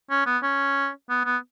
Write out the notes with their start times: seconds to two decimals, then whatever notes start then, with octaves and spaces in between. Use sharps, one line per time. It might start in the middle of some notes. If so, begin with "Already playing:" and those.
0.10 C#4
0.26 B3
0.43 C#4
1.10 B3
1.25 B3